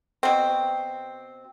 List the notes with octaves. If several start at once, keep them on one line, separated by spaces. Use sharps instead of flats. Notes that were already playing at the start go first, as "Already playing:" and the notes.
B2 C4